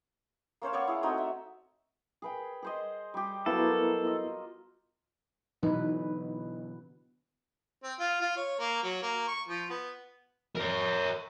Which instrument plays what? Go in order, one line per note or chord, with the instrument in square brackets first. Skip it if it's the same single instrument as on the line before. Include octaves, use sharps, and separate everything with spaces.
[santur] A#3 C#4 C5 F5
B3 C#5 D5 C#6
E4 G#4
A3 C4 D#4 F#4
E5
[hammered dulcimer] G#4 B4 G5
G#4 C5 D#5
G3 G4
[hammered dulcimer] F#3 A#4 F5 [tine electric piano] B3 E4 [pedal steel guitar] A4
[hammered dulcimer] F4 D#5
[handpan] B2 E3 B4 [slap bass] D3 F#3 B3 [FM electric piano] D#4
[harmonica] C4
F4
F4
C#5
A#3
F#3
A#3
C#6
F3
B3
[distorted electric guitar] A#4 C#5